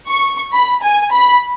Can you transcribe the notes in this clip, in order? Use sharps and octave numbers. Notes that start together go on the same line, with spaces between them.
C#6
B5
G#5
B5